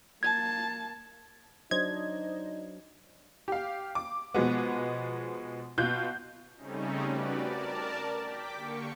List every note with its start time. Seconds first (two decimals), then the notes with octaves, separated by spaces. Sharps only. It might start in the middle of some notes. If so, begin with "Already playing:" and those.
0.23 A#3 A5 G#6
1.71 F#3 D4 D#4 C5 D#5 G#6
3.48 G4 F5
3.95 D6
4.34 B2 F3 G#3 B3
5.78 B2 F4 F#6 G6
6.56 C#3 G3 A3 C4 C#4 D#4
7.06 F#4 G4 B4 D5
7.42 A#4 D5 A5
8.18 G5 D6 B6
8.55 D3 A#3 G4 C#6 C#7